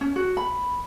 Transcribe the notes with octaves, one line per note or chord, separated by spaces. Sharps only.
C#4
F#4
B5